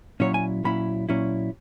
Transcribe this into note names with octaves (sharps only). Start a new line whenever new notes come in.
A#2 F#3 C#4 E4 C#5
G#5
A#2 F#3 C#4 E4 B5
A#2 F#3 C#4 E4